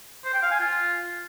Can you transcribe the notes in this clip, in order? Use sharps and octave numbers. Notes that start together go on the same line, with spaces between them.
C5
G5
F5
G#5
F4